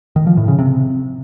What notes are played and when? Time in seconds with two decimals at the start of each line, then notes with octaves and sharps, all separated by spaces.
0.16 D#3
0.27 F3
0.37 A2
0.48 C#3
0.59 C3